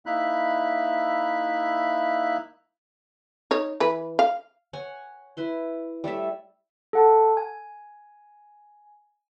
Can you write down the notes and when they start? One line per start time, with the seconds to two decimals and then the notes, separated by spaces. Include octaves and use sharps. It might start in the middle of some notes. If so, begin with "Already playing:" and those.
0.06 A#3 D#4 E4 E5 B5 F#6
3.51 D#4 C#5
3.80 E3 B4
4.19 F5
4.73 C#5 F#5 G#5
5.37 E4 B4 C6
6.04 G3 A3 C#5 E5
6.93 A4 F#5 A5
7.37 G#5